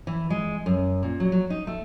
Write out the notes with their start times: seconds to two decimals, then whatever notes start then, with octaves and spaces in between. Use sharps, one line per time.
0.07 E3
0.30 G#3
0.66 F#2
1.03 A#2
1.20 F#3
1.32 F#3
1.50 D#4
1.67 A3